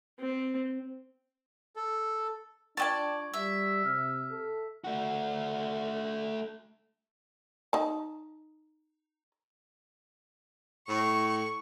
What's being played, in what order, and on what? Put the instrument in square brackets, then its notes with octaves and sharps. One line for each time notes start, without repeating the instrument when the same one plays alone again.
[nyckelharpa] C4
[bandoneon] A4
[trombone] D4 [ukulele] F4 G5 [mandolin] D5 D#5 A5 [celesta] C#6 G#6
[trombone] G3 [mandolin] E5
[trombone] C3 [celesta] F6
[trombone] A4
[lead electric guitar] A3 F#4
[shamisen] D#4 A5
[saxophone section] A2 [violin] C#6